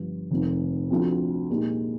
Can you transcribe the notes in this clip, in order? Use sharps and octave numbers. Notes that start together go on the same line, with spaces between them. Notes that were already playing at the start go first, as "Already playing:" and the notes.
Already playing: G1 G2 F3
F1 F2 D#3
D2 D3 F3 C4 F4
A#2 G#3 D#4 G4